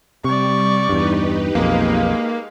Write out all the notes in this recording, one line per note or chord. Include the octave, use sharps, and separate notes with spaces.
C3 G3 D5 C#6
E2 G2 D#4 G4 B4
B1 F2 G#3 A#3 F5